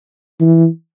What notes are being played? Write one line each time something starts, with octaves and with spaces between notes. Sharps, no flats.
E3